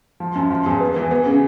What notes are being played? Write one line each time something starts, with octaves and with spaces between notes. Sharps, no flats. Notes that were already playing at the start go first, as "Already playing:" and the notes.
F3
F#2
F3
E2
B3
E3
B3
C#3